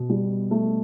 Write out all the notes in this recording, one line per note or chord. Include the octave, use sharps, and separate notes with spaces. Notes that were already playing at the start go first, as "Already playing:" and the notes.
Already playing: B2
G3
A3